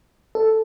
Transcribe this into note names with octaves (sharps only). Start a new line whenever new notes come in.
A4